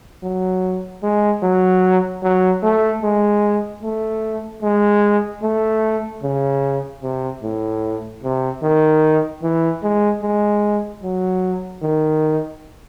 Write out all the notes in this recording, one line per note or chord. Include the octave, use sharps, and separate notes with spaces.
F#3
G#3
F#3
F#3
A3
G#3
A3
G#3
A3
C#3
C3
A2
C3
D#3
E3
G#3
G#3
F#3
D#3